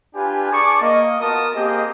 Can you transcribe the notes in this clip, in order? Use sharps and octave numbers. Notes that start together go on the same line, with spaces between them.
D4 F4 G4 B4 G#5
G#4 D5 A5 C#6 D6
A#3 D#5
B3 F4 F#4 A#4 A5 D#6
A#3 C4 G4 G#4 D#5